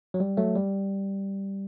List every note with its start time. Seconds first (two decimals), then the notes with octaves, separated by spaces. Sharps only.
0.14 F#3
0.20 G3
0.37 F#3 A3
0.55 G3